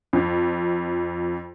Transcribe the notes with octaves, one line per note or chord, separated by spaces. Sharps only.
F2